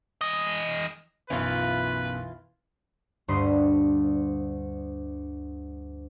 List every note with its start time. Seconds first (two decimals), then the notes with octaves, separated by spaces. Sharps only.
0.21 E3 D#5
1.30 B1 F#2 B2 E3 F4 B4
3.28 D2 G2 C5 D#5 B5 C6